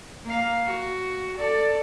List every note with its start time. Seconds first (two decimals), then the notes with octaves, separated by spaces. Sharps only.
0.25 A#3 F5
0.66 F#4
1.37 A4 D5